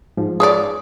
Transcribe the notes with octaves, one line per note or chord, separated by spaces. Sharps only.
G#2 F3
G#4 C#5 D5